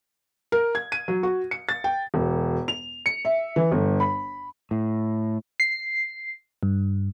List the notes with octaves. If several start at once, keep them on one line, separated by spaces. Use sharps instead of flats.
A#4
G#6
D#7
F#3
F#4
C#7
A6
G5
E1
F7
C#7
E5
E3
G1
B5
A2
C7
G2